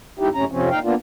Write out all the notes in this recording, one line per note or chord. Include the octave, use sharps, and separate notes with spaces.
E2 G#2 D#4 E4 G4
F#2 A2 C3 C#4 A#5
F2 C3 F3 C4 C#4
A#2 D#4 F5 G5
A#3 B3 D4 F4